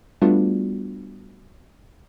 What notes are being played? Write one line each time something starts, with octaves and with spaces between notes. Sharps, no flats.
G3 A3 B3 D4 F4 F#4